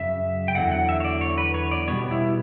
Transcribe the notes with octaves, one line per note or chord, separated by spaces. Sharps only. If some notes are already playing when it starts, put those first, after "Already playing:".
Already playing: F#2 C#3 E5
G5
E2 D3 F#3 F#5
F#5
E5
C#5
D5
C#5
B4
C#5
D5
B2 G3 B3 C#5
E4